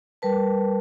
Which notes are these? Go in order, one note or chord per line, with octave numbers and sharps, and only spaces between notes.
G3 A#4 B4 A5